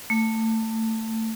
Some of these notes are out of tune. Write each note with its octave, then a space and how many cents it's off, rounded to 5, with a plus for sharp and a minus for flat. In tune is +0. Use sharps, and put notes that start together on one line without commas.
A3 +25